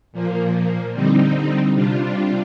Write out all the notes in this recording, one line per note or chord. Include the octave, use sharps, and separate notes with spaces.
A#2 F3 A#3
D3 G3 C4 D#4
C3 G3 D4 F4